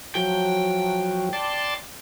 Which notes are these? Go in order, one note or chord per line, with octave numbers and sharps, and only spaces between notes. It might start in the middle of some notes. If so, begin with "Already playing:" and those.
F3 F#3 G5
D5 A5 C6